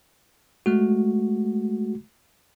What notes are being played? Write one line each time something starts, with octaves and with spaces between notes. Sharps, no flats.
G#3 A3 F#4